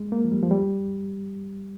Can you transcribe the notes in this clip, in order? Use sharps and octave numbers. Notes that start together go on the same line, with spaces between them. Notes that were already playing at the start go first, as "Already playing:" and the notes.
Already playing: G#3
A#3
F3
G3
F3
G3